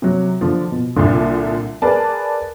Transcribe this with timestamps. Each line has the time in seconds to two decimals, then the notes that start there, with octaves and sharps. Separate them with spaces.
0.02 C3 F#3
0.41 D3 F3
0.71 B2
0.96 C2 A#2 D3
1.82 G#4 A#4 B4 D5 A5